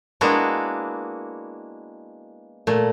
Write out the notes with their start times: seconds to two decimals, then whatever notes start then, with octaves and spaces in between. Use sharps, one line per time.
0.21 G#3 A#3 B3 D4 E4 F#4
2.67 A#2 A3